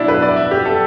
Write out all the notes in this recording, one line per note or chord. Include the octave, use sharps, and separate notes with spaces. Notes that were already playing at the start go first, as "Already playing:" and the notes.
Already playing: B2 D4 E4 F#4
B4
D5
E5
G4
A4